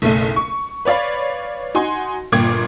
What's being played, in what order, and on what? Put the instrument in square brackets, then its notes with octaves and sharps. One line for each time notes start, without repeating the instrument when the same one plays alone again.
[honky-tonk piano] F#1 B1 A3 A4 D#7
C#6
B4 C#5 D5 F5 B5
D#4 F#4 G#5 C6
G1 A#2 F4 G5 D6 G#6